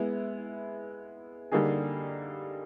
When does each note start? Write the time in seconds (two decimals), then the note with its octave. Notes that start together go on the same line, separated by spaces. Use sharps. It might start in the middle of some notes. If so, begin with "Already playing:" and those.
Already playing: G#3 B3 E4
1.52 D3 G3 A#3 D#4 G#4